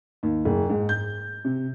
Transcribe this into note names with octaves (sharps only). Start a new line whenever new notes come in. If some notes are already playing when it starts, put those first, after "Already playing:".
D#2
F#1
G#2
G6
C3